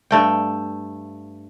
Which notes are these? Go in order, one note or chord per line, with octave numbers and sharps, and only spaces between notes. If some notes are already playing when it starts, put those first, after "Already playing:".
G2 A3 G5